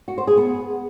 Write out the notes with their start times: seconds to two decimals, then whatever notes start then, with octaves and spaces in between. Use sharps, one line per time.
0.08 F#4
0.18 C5
0.27 G#4
0.37 B3